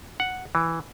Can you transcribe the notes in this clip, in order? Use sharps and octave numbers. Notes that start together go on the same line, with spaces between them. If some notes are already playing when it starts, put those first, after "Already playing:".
F#5
E3